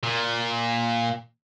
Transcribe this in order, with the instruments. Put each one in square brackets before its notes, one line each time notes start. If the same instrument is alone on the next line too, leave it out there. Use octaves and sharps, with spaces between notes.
[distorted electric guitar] A#2